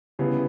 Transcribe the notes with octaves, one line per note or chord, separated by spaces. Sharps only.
C#3 G3 B3 E4